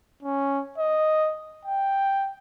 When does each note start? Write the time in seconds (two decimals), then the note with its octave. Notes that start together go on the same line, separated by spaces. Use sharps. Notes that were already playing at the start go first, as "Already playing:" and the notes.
0.23 C#4
0.78 D#5
1.66 G5